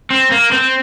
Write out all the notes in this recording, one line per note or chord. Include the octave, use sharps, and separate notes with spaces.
C4
A#3
C4